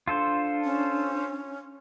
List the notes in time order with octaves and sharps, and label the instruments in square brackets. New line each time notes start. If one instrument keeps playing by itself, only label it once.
[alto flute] D4 [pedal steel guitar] F4 A4 C5
[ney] C#4